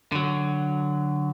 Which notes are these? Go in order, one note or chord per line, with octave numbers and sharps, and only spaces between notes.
D3 F#3